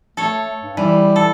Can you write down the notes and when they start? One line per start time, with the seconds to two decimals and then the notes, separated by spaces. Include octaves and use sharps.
0.17 A3 A4 C#5
0.62 G2
0.77 E3 G3
1.16 A4